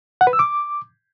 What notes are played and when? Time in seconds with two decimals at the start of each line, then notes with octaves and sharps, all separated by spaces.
0.21 F#5
0.27 B4
0.33 E6
0.39 D6